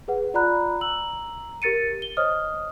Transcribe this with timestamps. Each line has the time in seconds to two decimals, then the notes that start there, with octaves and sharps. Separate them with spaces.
0.08 G#4 B4 F#5
0.34 F4 D5 F#5 A#5 B5 F#6
0.81 A#5 E6 F#7
1.62 G4 A#4 A6 C#7 D#7
2.02 G7
2.17 C5 C#5 D#5 D#6 F6